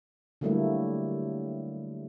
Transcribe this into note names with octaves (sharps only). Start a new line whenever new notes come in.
D3 F#3 G3 A3 A#3 E4